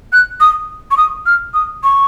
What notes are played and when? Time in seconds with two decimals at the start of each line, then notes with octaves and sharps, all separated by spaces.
0.13 F#6
0.41 D#6
0.91 C#6
0.97 D#6
1.26 F6
1.54 D#6
1.84 C#6